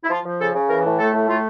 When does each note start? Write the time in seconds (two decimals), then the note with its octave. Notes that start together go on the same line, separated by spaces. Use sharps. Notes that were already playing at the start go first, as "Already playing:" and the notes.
0.04 E4
0.10 F3 F4
0.24 F3
0.39 C#3 A4
0.54 C#3
0.69 E3 A#4
0.84 A2
0.99 A3 A4
1.13 A2
1.28 A3 F4